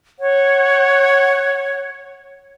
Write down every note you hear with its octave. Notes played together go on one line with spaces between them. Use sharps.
C#5 F#5